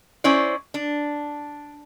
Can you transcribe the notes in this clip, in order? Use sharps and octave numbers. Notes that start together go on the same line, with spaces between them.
C#4 E4 C5 D5
D4